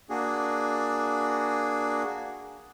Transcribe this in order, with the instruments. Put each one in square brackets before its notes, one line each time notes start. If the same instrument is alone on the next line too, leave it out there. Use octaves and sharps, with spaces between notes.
[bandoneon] A#3 D4 F#4 G#4